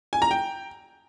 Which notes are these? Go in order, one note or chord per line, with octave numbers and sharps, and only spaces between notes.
G#5
A#5
G5